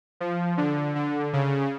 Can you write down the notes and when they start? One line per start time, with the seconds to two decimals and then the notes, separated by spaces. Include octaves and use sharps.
0.20 F3
0.57 D3
0.95 D3
1.33 C#3